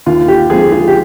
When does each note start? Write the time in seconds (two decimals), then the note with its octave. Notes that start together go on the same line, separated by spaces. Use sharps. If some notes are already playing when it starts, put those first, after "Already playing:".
0.06 D#2 F4
0.28 G4
0.50 D3 F3 G#3 C4 F4 G#4
0.72 F4 G#4
0.88 G4